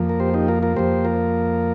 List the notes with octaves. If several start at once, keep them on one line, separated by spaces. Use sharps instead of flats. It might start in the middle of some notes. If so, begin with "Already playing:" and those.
Already playing: F2 F3 A#3
A#4
G4 C5
D#4 G4
F4 A#4
F4 A#4
F2 F3 A#3 G4 C5
F4 A#4